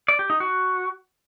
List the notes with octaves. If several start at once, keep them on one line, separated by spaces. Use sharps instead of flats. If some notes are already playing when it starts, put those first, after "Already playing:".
D5
G4
D#4
F#4